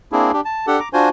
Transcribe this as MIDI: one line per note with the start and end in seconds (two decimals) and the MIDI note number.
0.12 0.32 58
0.12 0.32 60
0.12 0.32 62
0.12 0.32 64
0.12 0.32 68
0.33 0.41 62
0.33 0.41 67
0.45 0.66 81
0.67 0.79 62
0.67 0.79 67
0.67 0.79 69
0.67 0.79 78
0.80 0.89 82
0.80 0.89 86
0.93 1.09 62
0.93 1.09 65
0.93 1.09 66
0.93 1.09 72
0.93 1.09 80